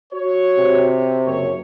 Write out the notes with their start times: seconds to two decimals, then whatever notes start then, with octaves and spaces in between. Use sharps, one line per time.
0.14 F#4 C#5
0.58 C3
1.26 F#1 C#5